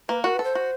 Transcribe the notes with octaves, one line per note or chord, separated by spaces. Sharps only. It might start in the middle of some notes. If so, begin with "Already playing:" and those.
A#3 B4
F#4 A#4
B4
A4
C5
F#4